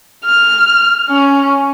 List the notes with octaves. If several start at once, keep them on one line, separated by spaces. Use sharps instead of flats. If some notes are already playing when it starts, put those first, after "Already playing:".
F6
C#4